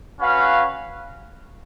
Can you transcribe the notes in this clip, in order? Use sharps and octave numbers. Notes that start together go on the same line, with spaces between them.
C#4 F#4 B4 F5